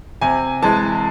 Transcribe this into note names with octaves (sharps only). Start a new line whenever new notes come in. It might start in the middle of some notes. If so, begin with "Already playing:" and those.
C3 G#5
E3 G#3 A5